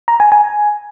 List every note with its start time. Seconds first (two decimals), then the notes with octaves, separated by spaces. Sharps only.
0.08 A#5
0.20 G#5
0.32 G#5